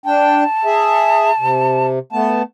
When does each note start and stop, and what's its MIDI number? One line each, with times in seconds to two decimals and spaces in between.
0.06 0.44 62
0.06 0.44 79
0.06 1.86 81
0.65 1.31 68
0.65 1.31 76
1.40 1.99 48
2.12 2.42 57
2.12 2.42 59
2.12 2.42 81